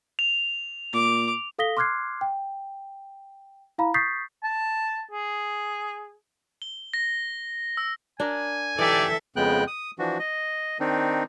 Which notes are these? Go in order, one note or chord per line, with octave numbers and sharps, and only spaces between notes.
F7
A#2 D6
A4 F5 D#6 A#6 B6 G7
C6 D6 F6 F#6 G#6 C7
G5
E4 F5 A#5 B5
C#6 D#6 G6 A6 B6 C7
A5
G#4
G7
A#6
E6
D4 A#4 G#5
E3 D#4 G4 A4 D5 E5
F2 C#3 G#3 B3 G5 F#6
D#6
E3 F3 D4 F#4
D#5
D#3 C4 D4 D#4